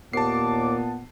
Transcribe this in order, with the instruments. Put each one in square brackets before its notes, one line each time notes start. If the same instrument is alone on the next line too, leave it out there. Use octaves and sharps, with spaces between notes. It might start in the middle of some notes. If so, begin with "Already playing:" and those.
[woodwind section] D#2 D6 [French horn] A#2 [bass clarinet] B3 [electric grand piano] A5 C7